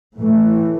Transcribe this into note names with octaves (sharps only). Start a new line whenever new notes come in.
A2 E3 A3